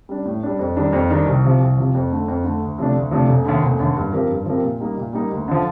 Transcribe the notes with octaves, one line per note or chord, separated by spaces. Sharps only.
G3 D4
A2
G3 D4
F2
D#3 G3 D4
F2
D#3 G3 D4
C2
C3 F3
C2
C3 F3
F2
D3 A3
F2
D3 A3
D2
C3 F3 A3 D4
D2
C3 F3 A3 D4
F1
D#2 D3
F1
D#2 D3
G2
F3 C4 G4 A#4
G2
F3 C4 G4 A#4
A#2
G3 A#3 D#4
A#2
G3 A#3 D#4
D2
D3 F3